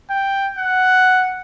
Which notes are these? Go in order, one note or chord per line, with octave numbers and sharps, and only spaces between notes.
G5
F#5